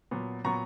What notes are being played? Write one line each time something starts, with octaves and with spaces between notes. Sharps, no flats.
A#2 F#3 B3
A#2 F#3 B3 A#5 C#6